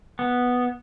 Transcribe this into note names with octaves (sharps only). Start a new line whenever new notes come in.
B3